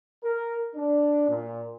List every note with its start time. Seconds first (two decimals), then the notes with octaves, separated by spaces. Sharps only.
0.24 A#4
0.75 D4
1.29 A#2